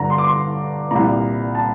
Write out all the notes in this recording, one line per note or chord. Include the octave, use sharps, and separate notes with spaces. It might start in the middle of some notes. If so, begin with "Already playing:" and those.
Already playing: G2 D3 A#5
C6
D6
C6
C2 A#2 A#5
A5